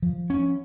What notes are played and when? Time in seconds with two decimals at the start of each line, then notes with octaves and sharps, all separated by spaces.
0.02 F3
0.30 C#4